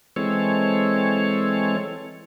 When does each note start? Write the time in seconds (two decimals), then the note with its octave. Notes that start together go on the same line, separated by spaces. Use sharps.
0.16 E3 G#3 C4 A4 C#5